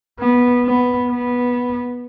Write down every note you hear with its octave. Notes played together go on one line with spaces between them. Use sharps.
B3
B3
B3